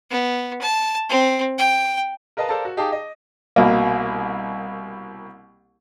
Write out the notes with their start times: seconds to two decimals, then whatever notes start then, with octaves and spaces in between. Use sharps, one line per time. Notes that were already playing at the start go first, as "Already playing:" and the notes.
0.10 B3
0.62 A5
1.09 C4
1.58 G5
2.37 A#4 B4 D#5 F5 A5
2.49 A4 A#4 C5 D5 F5 A5
2.65 F#4
2.77 D#4 G4 G#4 F5 A5 D6
2.92 D#5
3.56 C2 B2 A#3